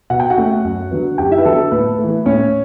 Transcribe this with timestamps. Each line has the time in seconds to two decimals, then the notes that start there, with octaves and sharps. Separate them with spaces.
0.10 B2 F#5
0.20 G5
0.30 F#4 F#5
0.37 A3 C#4
0.64 F#2
0.91 D3 F#3 B3
1.18 F#2 G4 G5
1.31 E4 E5
1.38 B4
1.45 D3 F#3 B3 A4
1.59 A4
1.72 A2 B4
1.99 E3 A3
2.26 A2 C#4 C#5